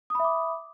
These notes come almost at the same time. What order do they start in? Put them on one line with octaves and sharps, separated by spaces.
D#6 B5 E5 D6